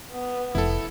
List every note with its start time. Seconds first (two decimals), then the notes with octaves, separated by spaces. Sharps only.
0.12 B3
0.55 F1 E4 A4